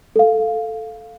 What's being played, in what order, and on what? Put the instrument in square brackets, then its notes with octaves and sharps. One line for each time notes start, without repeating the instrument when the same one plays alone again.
[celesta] A4 F5